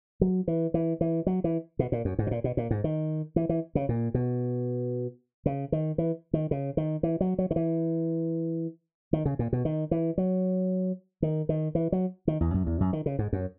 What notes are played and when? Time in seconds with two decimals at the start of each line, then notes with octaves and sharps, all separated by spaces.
0.21 F#3
0.48 E3
0.74 E3
1.01 E3
1.27 F#3
1.44 E3
1.79 B2
1.92 A#2
2.05 F#2
2.19 G#2
2.27 B2
2.31 A#2
2.44 B2
2.57 A#2
2.71 G#2
2.84 D#3
3.36 E3
3.49 E3
3.75 C#3
3.89 A#2
4.14 B2
5.46 C#3
5.72 D#3
5.98 E3
6.33 D#3
6.51 C#3
6.77 D#3
7.03 E3
7.21 F#3
7.38 F#3
7.51 D#3
7.56 E3
9.13 D#3
9.25 C#3
9.39 A#2
9.53 B2
9.65 D#3
9.91 E3
10.18 F#3
11.22 D#3
11.49 D#3
11.75 E3
11.92 F#3
12.28 D#3
12.41 E2
12.54 F#2
12.67 E2
12.80 F#2
12.93 D#3
13.06 C#3
13.19 G#2
13.33 F#2